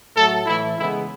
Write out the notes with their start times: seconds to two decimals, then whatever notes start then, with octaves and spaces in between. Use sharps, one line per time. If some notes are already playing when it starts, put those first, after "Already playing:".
0.15 A2 F#3 A3 A4
0.46 A2 E3 A3 E4
0.77 C#3 E3 G#3 B3 E4